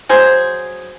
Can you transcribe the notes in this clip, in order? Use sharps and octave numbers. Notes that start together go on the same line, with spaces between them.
F#3 G#4 C5